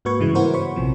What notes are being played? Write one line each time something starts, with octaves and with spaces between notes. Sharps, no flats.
G#2 A#3 F#4 B4 C#6 G#6
G2 C#3 E3 G#3
B3 E4 F#4 A#4 C5
C5 C#5 B5 C#6
A#1 C3 F3